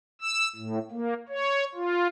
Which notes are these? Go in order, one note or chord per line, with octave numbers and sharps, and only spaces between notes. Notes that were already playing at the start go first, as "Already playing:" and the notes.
E6
A2
A#3
C#5
F4